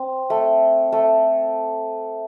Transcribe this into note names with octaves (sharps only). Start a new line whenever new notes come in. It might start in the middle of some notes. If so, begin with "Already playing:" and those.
Already playing: C4
A3
A3